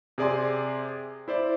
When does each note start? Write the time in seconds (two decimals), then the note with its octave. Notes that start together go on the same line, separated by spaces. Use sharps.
0.18 C3 G#4 D5 G#5 C6
1.28 E4 C5 D5